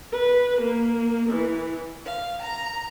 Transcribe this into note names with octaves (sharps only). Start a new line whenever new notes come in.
B4
A#3
E3
F5
A#5